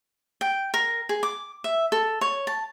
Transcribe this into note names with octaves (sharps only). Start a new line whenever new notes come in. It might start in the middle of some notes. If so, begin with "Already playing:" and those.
G5
A#4
G#4
D6
E5
A4
C#5
A5